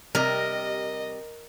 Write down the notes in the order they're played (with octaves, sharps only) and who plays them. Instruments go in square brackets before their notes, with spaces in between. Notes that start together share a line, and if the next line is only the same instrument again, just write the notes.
[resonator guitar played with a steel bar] C3 G3 G4 [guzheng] A#4 [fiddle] D#5